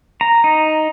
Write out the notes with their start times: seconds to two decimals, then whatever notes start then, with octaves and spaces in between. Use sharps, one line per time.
0.21 A#5
0.44 D#4